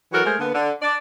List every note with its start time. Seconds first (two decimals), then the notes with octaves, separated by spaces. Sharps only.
0.12 E3 F#3 F#4 A4 A#4
0.24 G#3 A3 G#4 A#4 C5
0.39 D3 A#3 B3
0.54 D3
0.82 D4 D5